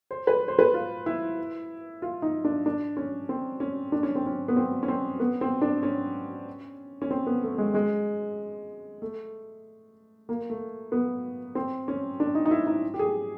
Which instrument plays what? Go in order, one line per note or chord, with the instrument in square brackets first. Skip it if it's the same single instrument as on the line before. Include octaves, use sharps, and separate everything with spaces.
[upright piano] C5
B4
C5
B4
F4
E4
F4
D#4
D4
D4
C#4
C4
C#4
D4
C#4
C4
C#4
B3
C4
C#4
C4
B3
C4
D4
C#4
C#4
C4
B3
A3
G#3
G#3
A3
A#3
A3
B3
C4
C#4
D4
D#4
D#4
E4
D#4
G4
G#4